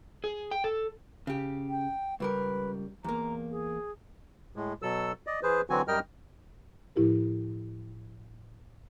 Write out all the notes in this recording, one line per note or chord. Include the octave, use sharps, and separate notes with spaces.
G#4
G5
A4
C#3 G4
G5
C#2 G3 A#4 B4
E2 A#3 A#5
G#4
A2 G#3
B2 F#3 A4 E6
D5 D#5
E3 G#4 B4 C5
D3 E3 F#3 C4 F#4 G#5
F#2 G3 A#4 D#5 G5 F6
A2 F3 E4 G4 A#4